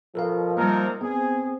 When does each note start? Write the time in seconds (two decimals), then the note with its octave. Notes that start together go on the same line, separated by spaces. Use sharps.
0.15 B2 F3 A4 A#4 F5
0.57 C3 G3 A#3 D#4 A#4
1.01 B3 C4 G#4